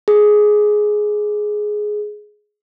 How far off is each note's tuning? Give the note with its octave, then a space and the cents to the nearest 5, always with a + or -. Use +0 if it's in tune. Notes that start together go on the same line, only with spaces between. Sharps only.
G#4 +10